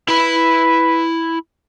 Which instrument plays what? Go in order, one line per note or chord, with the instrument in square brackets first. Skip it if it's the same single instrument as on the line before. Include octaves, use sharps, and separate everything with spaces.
[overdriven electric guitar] E4 B5 [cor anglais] B4